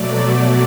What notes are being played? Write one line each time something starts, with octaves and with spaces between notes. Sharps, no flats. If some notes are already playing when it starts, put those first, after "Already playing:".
Already playing: B2 F#3 A3 D5